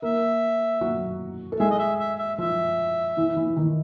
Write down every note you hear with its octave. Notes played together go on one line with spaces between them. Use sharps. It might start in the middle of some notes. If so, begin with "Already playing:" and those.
A#3 A#4 E5
F#3 F#4
A4
G#3 G#4 E5
D#5
E5
E5
E5
F3 F4 E5
E3 E4
E3 E4
E4
D#3 D#4